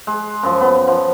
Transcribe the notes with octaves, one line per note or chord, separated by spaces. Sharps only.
G#3
F#2 F3
B3
F3